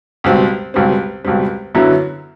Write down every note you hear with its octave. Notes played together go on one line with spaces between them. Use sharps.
C#2 B2 G3 C4
C#2 B2 G3 C4
C#2 B2 G3 C4
F#2 D3 F#3 B3 E4